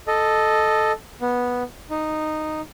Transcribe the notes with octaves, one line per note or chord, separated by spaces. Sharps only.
A4 D#5
B3
D#4